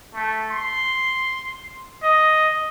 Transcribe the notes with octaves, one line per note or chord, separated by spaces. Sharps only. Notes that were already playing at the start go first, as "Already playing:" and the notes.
A3
C6
D#5